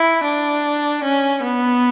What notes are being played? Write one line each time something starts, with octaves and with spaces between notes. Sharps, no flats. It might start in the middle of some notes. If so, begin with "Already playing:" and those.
Already playing: E4
D4
C#4
B3